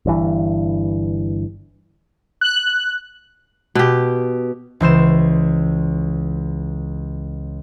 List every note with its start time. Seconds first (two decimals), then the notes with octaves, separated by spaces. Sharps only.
0.06 G1 G2 E3
2.41 F#6
3.75 B2 G4
4.80 C#2 E3 C5 E7